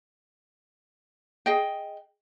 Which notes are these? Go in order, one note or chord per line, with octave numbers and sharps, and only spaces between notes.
G#4 D#5 G5